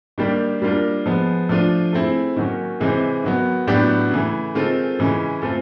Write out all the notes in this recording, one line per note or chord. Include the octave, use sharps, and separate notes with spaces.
D#3 G3 A#3 D4 G4
G3 A#3 D4 F4 A#4
F3 G#3 B3
F3 A3 D4 F4
A3 C4 E4 G#4
D#3 F#3 A#3 C#4
C3 E3 G#3 C4
D#3 F#3 B3
A2 F#3 B3 D4 G4
C#3 E3 A3
D#3 G#3 C4 F4 A4
C#3 E3 G#3 C#4
A3 C4 F4 A4